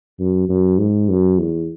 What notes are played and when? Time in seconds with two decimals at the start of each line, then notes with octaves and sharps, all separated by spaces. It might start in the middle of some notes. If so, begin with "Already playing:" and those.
0.20 F#2
0.49 F#2
0.79 G#2
1.09 F#2
1.38 E2